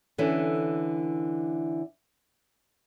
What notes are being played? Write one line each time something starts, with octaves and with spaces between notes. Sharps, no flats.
D3 E3 C#4 A4